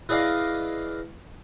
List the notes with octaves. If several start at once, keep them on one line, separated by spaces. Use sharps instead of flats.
E3 G#4 D5 D#5 F5